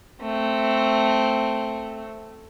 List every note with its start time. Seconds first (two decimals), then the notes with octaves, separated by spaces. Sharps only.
0.22 A3 C4